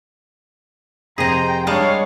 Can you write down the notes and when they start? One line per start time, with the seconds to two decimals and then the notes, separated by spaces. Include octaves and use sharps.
1.18 F2 C3 G#4 C5 D#5 G5 A#5
1.67 G3 G#3 D4 C#5 F5